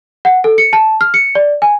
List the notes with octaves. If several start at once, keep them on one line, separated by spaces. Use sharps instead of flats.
F#5
A4
C#7
A5
F6
C#7
D5
G#5